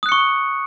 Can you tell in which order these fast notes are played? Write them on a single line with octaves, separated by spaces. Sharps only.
D#6 F#6 C#7 C#6